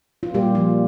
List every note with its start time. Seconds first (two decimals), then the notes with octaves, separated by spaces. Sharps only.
0.23 F4
0.33 A#2 G3 G4
0.55 F3 F4